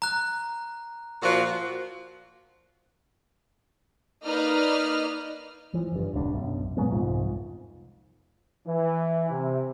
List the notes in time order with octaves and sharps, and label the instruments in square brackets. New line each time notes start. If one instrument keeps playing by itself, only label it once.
[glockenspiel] A#5 F#6
[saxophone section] A#2 F3 F#4
[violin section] A#3 D#4 B4 D5 D#5 F6
[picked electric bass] E3 F3
F#1 G2
D#1 C#2 D3 D4
B1 F#2 B2
A#2 F#3 G#3 B3
C2 F2 G#2 F3
[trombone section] E3
C3